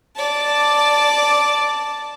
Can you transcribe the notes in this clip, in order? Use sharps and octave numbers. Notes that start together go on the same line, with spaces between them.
D5 A5